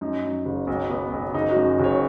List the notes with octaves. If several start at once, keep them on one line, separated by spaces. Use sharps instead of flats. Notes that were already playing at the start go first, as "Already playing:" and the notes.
F#2 D#4
F#2
F#1
B1
B3
B1
F#1 D#4
F#2 F#4
F#1 C#5